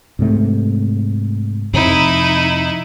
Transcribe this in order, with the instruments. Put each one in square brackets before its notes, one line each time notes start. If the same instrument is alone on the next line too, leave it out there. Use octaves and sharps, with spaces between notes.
[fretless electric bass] G#2 C3 A3
[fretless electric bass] F2 C3 [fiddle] D#4 E4